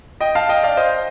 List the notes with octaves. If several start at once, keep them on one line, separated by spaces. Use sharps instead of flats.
D#5 G5
F5 A5
D#5 G5
D5 F5
C5 D#5